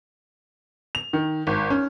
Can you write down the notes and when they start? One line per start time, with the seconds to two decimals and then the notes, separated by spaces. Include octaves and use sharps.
0.95 F7
1.13 D#3
1.47 G#1
1.70 C#4